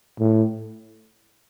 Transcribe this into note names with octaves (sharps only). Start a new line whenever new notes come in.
A2